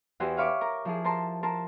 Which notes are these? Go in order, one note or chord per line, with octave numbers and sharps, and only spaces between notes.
E2 E4 F#4 G4 C5 G#5
C#5 E5 F5 B5 C#6 D6
A#4
F3 E4 G#4
A#4 C5 A5 C6
A#4 C5 A5